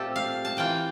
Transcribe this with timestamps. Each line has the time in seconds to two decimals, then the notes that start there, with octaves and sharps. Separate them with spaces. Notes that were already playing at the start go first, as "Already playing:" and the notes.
Already playing: A#2 A3 C4 F4 G4 A4
0.16 F5
0.45 A5
0.57 E3 A#3 F4 G5